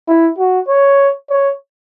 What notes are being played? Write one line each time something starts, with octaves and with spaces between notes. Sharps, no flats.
E4
F#4
C#5
C#5